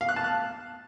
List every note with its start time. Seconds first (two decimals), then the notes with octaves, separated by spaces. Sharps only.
0.01 F5
0.09 F#6
0.16 A5
0.24 F#6